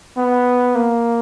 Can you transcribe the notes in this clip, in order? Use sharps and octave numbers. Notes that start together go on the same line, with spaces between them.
B3
A#3